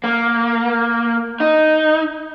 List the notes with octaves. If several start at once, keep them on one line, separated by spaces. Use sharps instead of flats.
A#3
D#4